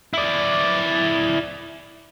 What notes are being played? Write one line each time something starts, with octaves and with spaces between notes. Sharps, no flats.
E4 D5